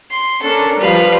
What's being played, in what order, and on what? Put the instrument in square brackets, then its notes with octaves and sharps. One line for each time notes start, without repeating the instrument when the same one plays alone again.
[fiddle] C6
[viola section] C#4 D4 A#4 [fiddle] A4
[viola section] F3 G3 [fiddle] B4 F5